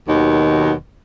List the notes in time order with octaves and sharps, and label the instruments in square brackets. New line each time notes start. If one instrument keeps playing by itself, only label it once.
[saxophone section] D#2 B2 D#3 F#3 D#4